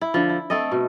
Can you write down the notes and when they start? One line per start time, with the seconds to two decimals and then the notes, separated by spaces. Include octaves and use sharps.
0.01 E4
0.14 D3 F3
0.29 E4
0.50 A3 C4 A4 D#5
0.72 B2